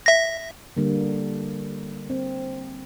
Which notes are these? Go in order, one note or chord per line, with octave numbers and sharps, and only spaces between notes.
E5 A#6
D3 G3 A#3
C4